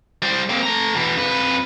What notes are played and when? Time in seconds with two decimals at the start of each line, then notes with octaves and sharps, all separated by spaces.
0.22 G3 C5
0.50 A#3 C4
0.63 A3 A#5
0.95 B2 E3
1.17 F2 B4